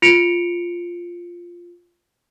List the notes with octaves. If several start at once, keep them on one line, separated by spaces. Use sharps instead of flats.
F4 C#7 D7 F7